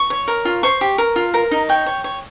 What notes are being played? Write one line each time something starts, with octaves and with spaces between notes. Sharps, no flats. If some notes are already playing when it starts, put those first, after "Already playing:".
Already playing: C#6
C#5
A#4
F4
C5 C#6
G4
A#4
F4
A#4 A#5
D#4
C#5 G5
C#5
C#5